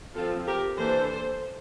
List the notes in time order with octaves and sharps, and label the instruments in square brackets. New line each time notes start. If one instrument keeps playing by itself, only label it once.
[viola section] F3 C4 F4 A4
G4 A#4
E3 A#3 D4 A4 C5